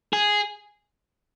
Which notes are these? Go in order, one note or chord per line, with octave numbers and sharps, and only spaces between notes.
G#4